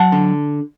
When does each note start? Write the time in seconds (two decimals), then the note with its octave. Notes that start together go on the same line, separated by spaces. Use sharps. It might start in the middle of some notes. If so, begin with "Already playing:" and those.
Already playing: F#3 F#5 A5
0.12 D3